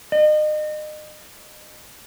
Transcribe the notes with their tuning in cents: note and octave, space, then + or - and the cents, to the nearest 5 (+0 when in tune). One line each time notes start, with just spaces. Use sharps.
D#5 -35